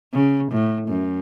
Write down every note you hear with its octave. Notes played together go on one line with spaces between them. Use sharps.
C#3
A2
F#2